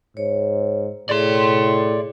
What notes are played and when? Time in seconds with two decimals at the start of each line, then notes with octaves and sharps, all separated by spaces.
0.17 G#2 C#5
1.09 A2 G#4 D5 E5 C6